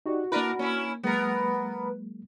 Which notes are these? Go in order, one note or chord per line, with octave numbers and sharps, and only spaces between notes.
D#4 F#4 G4 D5
A#3 D4 E4 A#4 B4
A#3 C#4 E4
F#3 G#3 A#3 B3 A#4 B4